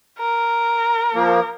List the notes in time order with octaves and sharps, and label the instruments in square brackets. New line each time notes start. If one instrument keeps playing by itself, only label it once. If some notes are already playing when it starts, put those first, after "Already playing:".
[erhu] A#4
[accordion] F3 A#3